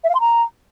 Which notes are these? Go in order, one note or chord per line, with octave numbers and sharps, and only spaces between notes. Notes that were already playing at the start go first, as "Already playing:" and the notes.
E5
F5
C6
A#5